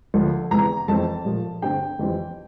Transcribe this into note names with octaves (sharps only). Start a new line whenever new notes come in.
D2 D3 F3
E2 C3 E3 A#5
F2 E3 A3 C4 A5
A#2 F3 A3
G2 D3 A3 C4 G5
F2 E3 G3 C4